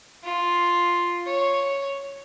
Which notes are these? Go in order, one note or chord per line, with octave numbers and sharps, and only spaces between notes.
F4
C#5